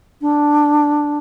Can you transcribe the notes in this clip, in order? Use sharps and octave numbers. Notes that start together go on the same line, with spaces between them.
D4